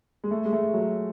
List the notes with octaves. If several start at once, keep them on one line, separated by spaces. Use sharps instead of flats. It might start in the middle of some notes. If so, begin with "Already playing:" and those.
G#3
A3
G#3
A3
F#3